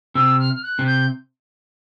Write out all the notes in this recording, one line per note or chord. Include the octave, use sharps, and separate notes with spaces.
C3 E6
F6
F6
F#6
C3
G6